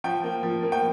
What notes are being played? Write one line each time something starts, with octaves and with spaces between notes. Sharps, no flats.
F3 G5
A#3
F3
A#3
G5